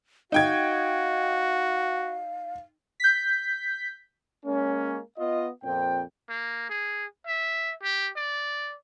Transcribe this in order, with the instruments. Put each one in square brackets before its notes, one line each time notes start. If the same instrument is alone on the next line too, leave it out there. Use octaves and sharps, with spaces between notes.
[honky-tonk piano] D#4 G5 G#6 [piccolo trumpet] F#4 [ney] F5
[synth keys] G6 B6
[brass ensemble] G#3 A#3 C#4
B3 F4 D#5
F2 A#2 C4 G5
[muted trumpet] A#3
G#4
E5
G4
D5